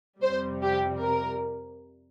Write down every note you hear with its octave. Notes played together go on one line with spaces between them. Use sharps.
F2 C3 G3 C5
G4
A#4